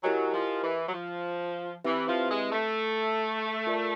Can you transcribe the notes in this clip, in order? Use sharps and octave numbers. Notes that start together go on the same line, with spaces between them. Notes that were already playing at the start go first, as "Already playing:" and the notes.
F#3 E4 G4 A#4 D#5 G#5
F3
E3
F#3
F3
E3 C4 E4 G4 B4 E5
F3
G#3
A3
F4 A#4 D5